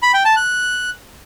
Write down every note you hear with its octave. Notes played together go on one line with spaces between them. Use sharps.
B5
G5
A5
F#6